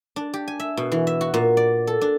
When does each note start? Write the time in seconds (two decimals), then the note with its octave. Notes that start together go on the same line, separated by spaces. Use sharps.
0.16 D4
0.34 G4
0.48 G#5
0.60 E5
0.77 B2
0.92 E3
1.07 E5
1.21 F#4
1.34 A#2
1.57 D5
1.87 A4
2.01 D4